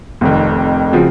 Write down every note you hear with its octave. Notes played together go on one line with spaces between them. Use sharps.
F1 F2 D#3
C#3 F3 C4 F#4